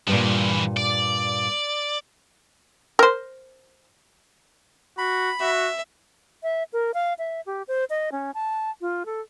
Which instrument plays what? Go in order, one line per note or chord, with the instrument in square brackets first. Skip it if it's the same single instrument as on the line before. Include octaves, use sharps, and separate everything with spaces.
[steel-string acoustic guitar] G2 A#2 [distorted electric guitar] E3 F3
[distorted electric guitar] D5
[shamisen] A#4 C5
[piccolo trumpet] F#4 [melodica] B5
[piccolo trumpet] F#4 [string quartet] E5
[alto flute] E5
A#4
F5
E5
G4
C5
D#5
C#4
A5
F4
A4